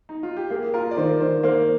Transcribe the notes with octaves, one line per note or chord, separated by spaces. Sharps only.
D#4
F4
G4
A#3 G#4
F4 A#4
D5
D#3 C5
D#3 C5
A#3 C5